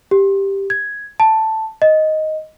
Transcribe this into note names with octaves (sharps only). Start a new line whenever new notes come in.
G4
G#6
A5
D#5